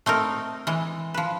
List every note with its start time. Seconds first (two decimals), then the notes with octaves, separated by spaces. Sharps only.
0.06 A3 C4 D#4 A#4
0.67 E3 G#3
1.14 F3 B4